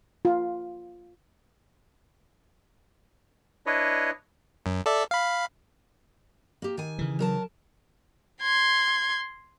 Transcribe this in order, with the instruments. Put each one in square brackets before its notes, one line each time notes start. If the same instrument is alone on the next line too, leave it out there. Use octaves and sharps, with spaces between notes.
[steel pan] F4
[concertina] D4 E4 B4 C#5 D#5
[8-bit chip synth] F#2
A4 D5 E5
F5 B5
[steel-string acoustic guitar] A#3 G4
D#3 G#5
[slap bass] C#3 E3
[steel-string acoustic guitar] F#3 A#4 A5
[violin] C6 G#6